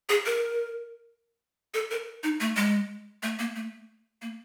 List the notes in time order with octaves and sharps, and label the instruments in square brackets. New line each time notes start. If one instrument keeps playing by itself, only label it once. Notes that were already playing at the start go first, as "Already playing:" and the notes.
[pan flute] G#4
A#4
A4
A#4
D#4
A3
G#3
A3
A#3
A3
A#3